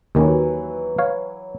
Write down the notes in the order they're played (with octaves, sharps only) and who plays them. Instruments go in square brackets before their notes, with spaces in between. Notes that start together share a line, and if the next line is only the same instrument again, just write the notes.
[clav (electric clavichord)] D#2 D#3 C#4 [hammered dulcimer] E3 F#3 B4
[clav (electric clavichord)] C#5 F5